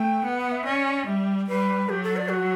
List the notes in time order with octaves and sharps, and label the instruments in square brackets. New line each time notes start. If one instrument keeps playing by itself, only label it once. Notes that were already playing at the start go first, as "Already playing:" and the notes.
Already playing: [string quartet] A3 [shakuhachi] G5
[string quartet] B3 [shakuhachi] F#5
[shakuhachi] F#5
E5
[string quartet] C#4 [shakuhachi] D5
[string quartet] G3 [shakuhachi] E5
[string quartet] G3 [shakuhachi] B4
[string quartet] F#3 [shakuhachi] G4
[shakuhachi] A4
D5
F#4